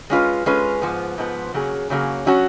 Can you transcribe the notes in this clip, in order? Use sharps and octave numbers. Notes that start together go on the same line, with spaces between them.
G#3 C#4 F4 B4
G#3 C#4 F4 B4
G#2 F3 B3
G#2 F3 B3
C#3 F#3 A#3 C#4 G#4
C#3 F#3 A#3 C#4 G#4
F#3 C#4 F#4